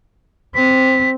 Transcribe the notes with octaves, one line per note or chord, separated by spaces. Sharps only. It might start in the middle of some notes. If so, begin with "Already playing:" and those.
C4 B6